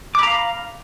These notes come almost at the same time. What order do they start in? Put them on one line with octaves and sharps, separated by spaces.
D6 B5 A#5 F5